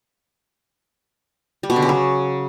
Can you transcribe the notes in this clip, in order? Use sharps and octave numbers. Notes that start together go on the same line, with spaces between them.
G3
B2
D3
C#3
F#3